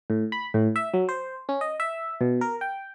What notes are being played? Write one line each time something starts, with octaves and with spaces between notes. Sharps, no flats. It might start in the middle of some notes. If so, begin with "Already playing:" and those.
A2
B5
A2
E5
F#3
C5
C#4
D#5
E5
B2
A#4
G5